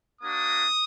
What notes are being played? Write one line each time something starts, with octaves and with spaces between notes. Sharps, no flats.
A#3 D4 F#4 D#6